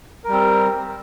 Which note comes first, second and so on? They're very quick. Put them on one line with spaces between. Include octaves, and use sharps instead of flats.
A#4 G3 C4